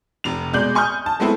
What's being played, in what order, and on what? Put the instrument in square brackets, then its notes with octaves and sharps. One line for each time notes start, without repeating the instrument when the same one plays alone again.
[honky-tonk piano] F1 C3 F7
B2 G#3 D5 G6 F#7
G#5 C#6 D#6 F6 G6
A5
G#3 A3 B3 C4 E4 A4